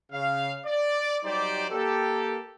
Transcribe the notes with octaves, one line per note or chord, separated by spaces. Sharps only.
C#3 F5
D5
F#3 G3 D#4 G4 C5 D5
A#3 G4 A4